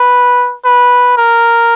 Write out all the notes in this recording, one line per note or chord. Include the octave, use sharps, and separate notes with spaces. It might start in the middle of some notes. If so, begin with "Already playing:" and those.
Already playing: B4
B4
A#4